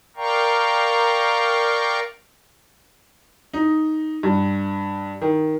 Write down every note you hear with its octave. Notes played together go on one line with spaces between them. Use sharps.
A#4 D5 F5 G5 A#5 C#6
D#4
G2
D#3